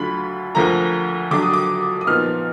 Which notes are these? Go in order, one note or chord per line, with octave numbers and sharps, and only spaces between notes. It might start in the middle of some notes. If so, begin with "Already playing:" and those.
Already playing: D2 D3 F#3 D4 F4 B5
D2 D3 F3 A#3 A#5
D3 F#3 D4 D6
D#6
D6
D#6
A#2 F3 B3 D#4 F6